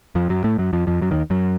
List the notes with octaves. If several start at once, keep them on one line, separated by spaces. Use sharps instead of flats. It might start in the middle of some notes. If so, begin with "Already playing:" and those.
F2 F3
F#2 F#3
A2 A3
F#2 F#3
F2 F3
F2 F3
F#2 F#3
D#2 D#3
F#2 F#3